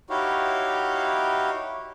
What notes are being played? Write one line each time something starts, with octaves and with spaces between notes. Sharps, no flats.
D#4 E4 F#4 G4 C#5 F5